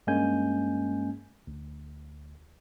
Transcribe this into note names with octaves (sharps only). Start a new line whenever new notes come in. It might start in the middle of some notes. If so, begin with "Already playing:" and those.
G2 G#3 A#3 C#4 G#5 G6
D2